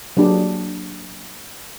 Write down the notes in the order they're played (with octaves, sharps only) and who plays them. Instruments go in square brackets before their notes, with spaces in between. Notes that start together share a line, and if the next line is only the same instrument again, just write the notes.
[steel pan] F#3 A#3 D4 G4 G#4